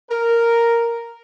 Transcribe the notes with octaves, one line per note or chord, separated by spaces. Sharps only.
A#4